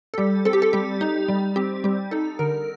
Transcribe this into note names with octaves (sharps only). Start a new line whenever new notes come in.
A4
G3 G4
C4 A4
G4
A4
G3 G4
D#4
G3
C4 G4
G3 G4
D#4 A4
D3 A#4